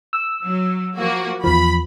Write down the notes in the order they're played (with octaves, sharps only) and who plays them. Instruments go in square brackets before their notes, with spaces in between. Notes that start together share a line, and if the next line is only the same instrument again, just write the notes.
[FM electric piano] E6
[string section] F#3
F3 A#3 F#4
[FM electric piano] E2 F3 [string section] B5